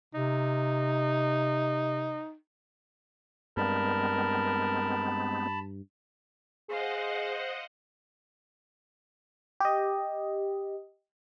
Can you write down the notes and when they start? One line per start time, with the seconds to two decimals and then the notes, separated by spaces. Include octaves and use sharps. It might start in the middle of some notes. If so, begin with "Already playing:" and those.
0.14 C3 D#4
3.57 G2 G#3 B3 C4 A#4 A5 B5
6.68 G#4 C5 D#5 F5 F#5
9.60 G4 D#5